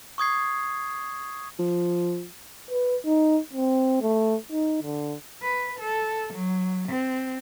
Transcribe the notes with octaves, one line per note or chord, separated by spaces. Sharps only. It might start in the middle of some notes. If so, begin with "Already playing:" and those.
C#6 D#6 G#6 C7
F3
B4
D#4
C4
A3
D#4
D3
B4
A4
F#3
C4